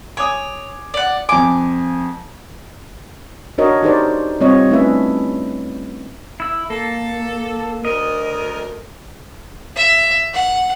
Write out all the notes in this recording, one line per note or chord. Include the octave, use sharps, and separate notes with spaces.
C#5 G#5 D6 D#6
D5 F#5
F2 G#5 D6
D4 F#4 A#4 C#5 D#5
D#4 G4 A4 A#4 C5 D5
G3 C4 F4 C#5 D#5
A3 C#4 D4 E4 B4 E5
E4 E6
A#3 A4
D2 A#4 D#5
E5
F#5